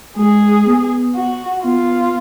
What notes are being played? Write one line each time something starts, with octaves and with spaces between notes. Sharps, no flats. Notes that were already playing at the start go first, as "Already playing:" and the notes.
G#3 G#4
B3
F#4
B3 F4